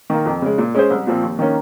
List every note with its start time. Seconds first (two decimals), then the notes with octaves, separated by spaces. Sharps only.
0.10 D#3 A#3
0.26 F2
0.42 C#3 G#3
0.58 A#2
0.74 G#3 C#4 G#4 C5
0.91 C2
1.07 A#2 F3 C4
1.23 D#2
1.39 D#3 A#3 C#4